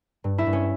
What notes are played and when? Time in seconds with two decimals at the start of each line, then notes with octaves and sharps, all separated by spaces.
0.24 G2
0.38 E4 E5
0.46 G2
0.53 C#4 C#5